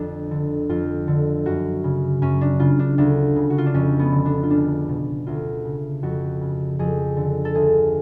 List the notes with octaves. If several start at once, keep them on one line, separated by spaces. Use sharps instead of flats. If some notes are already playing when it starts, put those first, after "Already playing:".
Already playing: F2 D3 D4
D3
F2 F4
D3
F#2 F#4
C#3
F#2 C#4
D4
C#3 F4
D4
D2 D4
C#3
F#4
F4
D4
F2 C#4
B3
D3
D4
F4
C#2 D4
B2
D2 F4
C#3
F2 F#4
C#3
F2 G#4
D3
A4
D2 G#4